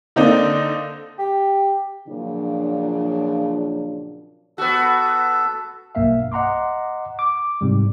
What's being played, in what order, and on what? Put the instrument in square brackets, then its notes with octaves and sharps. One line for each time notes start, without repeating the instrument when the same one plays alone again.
[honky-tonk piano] D3 A#3 C4 D4 D#4
[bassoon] G4
[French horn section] A#2 C#3 F3 F#3 D4
[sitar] B3 F#4 [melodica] A4
[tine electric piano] B1 G2 A#3 E5 F5
D#5 F#5 A#5 C6 D6
D6
G#2 C3 G3